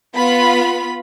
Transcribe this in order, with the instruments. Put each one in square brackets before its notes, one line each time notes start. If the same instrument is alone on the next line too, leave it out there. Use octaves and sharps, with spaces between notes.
[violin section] B3 F4 B5